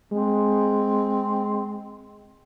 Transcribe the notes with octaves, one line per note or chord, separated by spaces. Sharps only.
G#3 C4